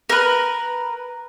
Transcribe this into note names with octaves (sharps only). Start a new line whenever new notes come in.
A#4 B4